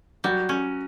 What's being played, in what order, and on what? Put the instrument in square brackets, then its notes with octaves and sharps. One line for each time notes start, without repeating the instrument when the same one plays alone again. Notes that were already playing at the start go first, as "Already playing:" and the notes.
[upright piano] F#3 F#4 [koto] G3
[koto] C#4